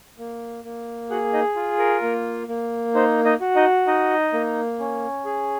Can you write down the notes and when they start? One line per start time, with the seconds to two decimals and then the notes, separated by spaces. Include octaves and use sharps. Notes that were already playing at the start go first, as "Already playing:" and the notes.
0.18 A#3
0.64 A#3
1.10 F#4 G#4 F#5
1.33 D#4 D#5
1.56 F4
1.79 A#4
2.02 A#3
2.48 A#3
2.95 D#4 C5
3.25 D#4 D#5
3.41 F#4
3.56 D#4 D#5
3.87 D#4 D#5
4.33 A#3
4.79 C#4
5.25 G#4